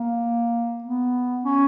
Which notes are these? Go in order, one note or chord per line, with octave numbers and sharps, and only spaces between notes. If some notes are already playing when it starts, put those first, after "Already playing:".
Already playing: A#3
B3
C#4